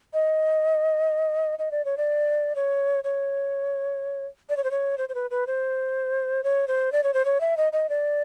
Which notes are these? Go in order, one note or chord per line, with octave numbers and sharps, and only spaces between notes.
D#5
D#5
D5
C#5
D5
C#5
C#5
D5
C#5
C5
C#5
C5
C5
B4
B4
C5
C#5
C5
D5
C#5
C5
C#5
E5
D#5
D#5
D5